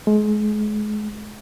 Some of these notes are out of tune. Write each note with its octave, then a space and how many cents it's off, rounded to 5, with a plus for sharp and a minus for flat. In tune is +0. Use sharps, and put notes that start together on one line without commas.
G#3 +30